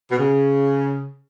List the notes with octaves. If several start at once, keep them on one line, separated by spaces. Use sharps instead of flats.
B2
C#3